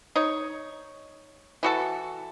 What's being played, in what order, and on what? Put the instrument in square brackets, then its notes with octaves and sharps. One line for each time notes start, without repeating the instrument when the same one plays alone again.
[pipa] D#4 C#5
E3 F#4 A4